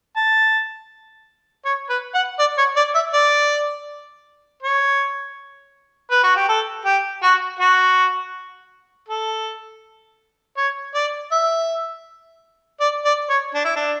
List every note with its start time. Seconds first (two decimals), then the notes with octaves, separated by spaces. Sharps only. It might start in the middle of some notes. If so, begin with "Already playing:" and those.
0.16 A5
1.65 C#5
1.90 B4
2.15 F#5
2.39 D5
2.58 C#5
2.76 D5
2.95 E5
3.14 D5
4.63 C#5
6.11 B4
6.24 F#4
6.36 G4
6.48 A4
6.85 G4
7.23 F#4
7.60 F#4
9.09 A4
10.57 C#5
10.95 D5
11.32 E5
12.80 D5
13.05 D5
13.29 C#5
13.55 D4
13.65 E4
13.76 D4